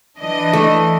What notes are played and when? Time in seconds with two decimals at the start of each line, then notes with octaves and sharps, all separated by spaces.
0.19 E3 D4 D#5
0.53 A3